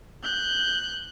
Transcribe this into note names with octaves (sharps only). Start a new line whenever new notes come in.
F#6 G6